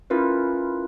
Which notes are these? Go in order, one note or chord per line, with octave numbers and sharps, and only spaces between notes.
C#4 E4 F4 A#4 B4